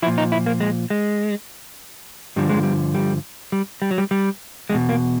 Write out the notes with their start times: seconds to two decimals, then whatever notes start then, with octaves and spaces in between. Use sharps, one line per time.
0.02 F3 E4
0.07 A#2
0.18 D#4
0.32 E4
0.46 A#3
0.60 G#3
0.90 G#3
2.36 G2 D3 F3 G3
2.49 G#3
2.63 G3
2.95 G3
3.52 G3
3.82 G3
3.91 F#3
3.98 G3
4.11 G3
4.70 E2 B2 G#3
4.89 A#3